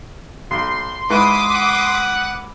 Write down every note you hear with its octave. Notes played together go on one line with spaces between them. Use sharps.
B1 C6
G#2 E4 B4 D6 D#6 B6
F#5